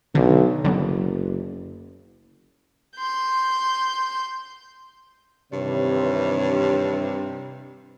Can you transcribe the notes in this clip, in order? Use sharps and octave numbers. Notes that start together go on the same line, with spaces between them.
B1 D3
F#1 D3 F#3 B3
C6 G6
G2 C3 D#3 E3 C#5